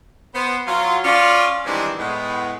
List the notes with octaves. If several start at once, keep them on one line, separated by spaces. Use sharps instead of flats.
B3 C5
F#3 F4
C#4 F4 D5
D#3 E3 G3 G#3 C4 D4
A2 G#3 B3